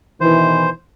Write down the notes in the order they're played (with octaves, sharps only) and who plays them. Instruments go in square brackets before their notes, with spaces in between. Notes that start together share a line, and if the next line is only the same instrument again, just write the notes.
[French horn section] B2 D#3 E3 [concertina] C5